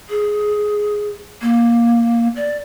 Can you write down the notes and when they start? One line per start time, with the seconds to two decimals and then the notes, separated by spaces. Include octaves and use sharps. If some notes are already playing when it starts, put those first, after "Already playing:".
0.10 G#4
1.42 A#3
2.36 D5